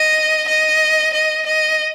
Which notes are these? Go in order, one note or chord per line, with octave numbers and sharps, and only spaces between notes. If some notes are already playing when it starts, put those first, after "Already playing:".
Already playing: D#5
D#5
D#5
D#5